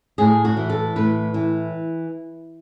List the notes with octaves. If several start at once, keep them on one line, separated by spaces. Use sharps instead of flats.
A2 G#4
F#4
E3
A4
A2 B4
E3